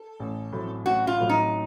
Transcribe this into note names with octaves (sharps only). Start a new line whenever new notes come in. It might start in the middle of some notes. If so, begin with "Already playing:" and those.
Already playing: A4
A1
A2 F#3 A3 C4
A1 F#4
F4
A2 F#3 A3 C4
D#4